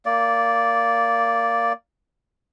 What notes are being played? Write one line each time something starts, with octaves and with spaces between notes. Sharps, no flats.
A#3 D5